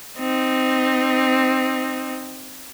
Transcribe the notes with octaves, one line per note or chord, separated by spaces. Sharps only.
C4 D#4